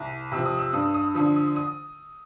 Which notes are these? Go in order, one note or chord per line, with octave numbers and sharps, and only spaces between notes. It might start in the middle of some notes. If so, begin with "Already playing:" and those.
Already playing: C2
C3 F3 E6
D#6
E6
G2 D#6
D#6
D3 F3 D#6
D#6
D#6